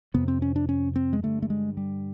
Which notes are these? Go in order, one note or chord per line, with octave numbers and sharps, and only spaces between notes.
F2 C3 B3
C4
C#4
D4
C#4
C4
G#3
G2 D3 A3
A3
G#3
G3